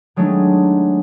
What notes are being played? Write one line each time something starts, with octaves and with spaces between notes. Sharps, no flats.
D#3 F#3 G#3 A3 D4 D#4